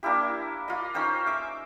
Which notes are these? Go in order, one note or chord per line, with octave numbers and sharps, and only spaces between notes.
A#3 D4 E4 G4
F4 D#5
C#4 D#4 C5 G5
E5 D6